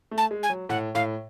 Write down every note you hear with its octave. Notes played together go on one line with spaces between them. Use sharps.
A3
A5
G#3
G#5
F#3
A2 F#5
A2 F5